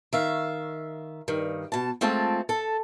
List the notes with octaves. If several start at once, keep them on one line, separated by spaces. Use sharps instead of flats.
D#3 E5 F5
G2 D#3
B2 A5
G#3 A3 C4 F4 A5
A4